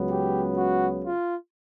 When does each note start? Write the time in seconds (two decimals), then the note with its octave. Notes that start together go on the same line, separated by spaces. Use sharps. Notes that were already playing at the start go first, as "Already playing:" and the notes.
Already playing: C#2 C#3 F#3 B3
0.11 G4
0.57 F#4
1.03 F4